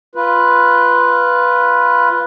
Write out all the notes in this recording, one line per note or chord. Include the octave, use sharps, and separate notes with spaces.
F4 B4